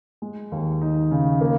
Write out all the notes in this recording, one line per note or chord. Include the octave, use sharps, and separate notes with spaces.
G#3
D#2
D#4
C#3
A#3